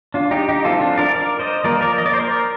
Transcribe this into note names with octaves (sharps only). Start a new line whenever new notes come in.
D4 F4
D#4 G4
D#4 G4
F3 A3 C4 F4 A4
D4 F4
A#4 D5
A#4 D5
C5 D#5
F3 A#3 A#4 D5
A#4 D5
D#5
D5
C5
A#4 D5